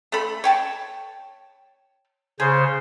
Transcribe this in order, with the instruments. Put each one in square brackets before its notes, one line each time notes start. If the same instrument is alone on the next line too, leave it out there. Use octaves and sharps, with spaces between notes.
[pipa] A3 A4 B5
C#5 G5 A5
[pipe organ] C#3 C5 [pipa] G#4